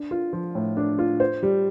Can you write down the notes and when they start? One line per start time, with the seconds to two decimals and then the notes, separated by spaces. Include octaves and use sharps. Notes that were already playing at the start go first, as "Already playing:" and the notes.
Already playing: D4
0.11 F4
0.33 F3
0.55 A2
0.77 D4
0.98 F4
1.20 C5
1.43 G3